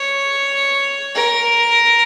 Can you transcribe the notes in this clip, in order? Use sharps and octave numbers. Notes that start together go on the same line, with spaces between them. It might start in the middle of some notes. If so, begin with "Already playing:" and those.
Already playing: C#5
A#4